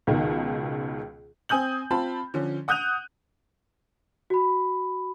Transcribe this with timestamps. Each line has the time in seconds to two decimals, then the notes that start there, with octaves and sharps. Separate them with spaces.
0.07 C#2 B2 D#3
1.49 C4 G#5 D#6 G6 F#7
1.91 C4 F4 A5 B5
2.34 D3 F3 C#4
2.68 F#5 D#6 F#6 G6 D#7 F7
4.30 F#4 B5